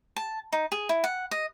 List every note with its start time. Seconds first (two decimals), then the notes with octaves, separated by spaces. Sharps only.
0.16 A5
0.52 D#4
0.72 G#4
0.89 E4
1.04 F#5
1.31 D#5